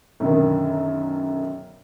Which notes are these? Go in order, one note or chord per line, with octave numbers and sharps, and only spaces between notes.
B1 F#2 D3 D#3